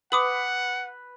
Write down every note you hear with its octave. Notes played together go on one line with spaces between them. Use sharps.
B4 F#5 D6 D#6 F#7